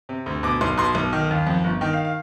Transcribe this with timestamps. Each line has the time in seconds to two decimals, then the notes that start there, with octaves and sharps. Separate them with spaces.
0.09 C3
0.26 D2
0.43 B2 D6
0.61 B1 C6
0.78 B2 C6
0.95 B1
1.13 D#3
1.30 D#2
1.47 F2
1.64 G1
1.81 D#3 G5
1.93 F5
2.05 F5